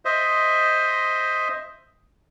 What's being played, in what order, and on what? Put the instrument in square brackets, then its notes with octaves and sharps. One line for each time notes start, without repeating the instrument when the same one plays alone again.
[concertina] C5 D#5 E5